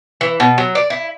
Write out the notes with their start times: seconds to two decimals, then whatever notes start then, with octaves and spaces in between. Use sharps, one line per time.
0.21 E3
0.40 B2
0.58 F#3
0.75 D5
0.90 E4